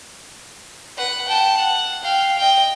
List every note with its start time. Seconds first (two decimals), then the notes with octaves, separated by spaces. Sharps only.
0.97 B4 F#5
1.27 G5 A5
1.57 F#5
2.04 F5 G5
2.38 D#5 G5